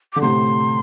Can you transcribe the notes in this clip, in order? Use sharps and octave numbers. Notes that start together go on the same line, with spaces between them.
D3 D6
A2 C3 C6